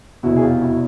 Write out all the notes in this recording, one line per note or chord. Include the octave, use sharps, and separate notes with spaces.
F1 E2 B2 E4 F#4
G#4
F4 G4
E4 F#4